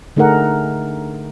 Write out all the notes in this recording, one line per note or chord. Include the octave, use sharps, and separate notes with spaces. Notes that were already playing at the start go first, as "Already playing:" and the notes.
D3 A3 D#4 G#4 A#4 F#5